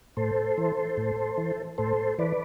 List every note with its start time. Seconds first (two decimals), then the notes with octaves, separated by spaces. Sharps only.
0.17 A2 A4 C5
0.58 E3
0.97 A2
1.38 E3
1.78 A2 A4 C5
2.18 E3 B4 D5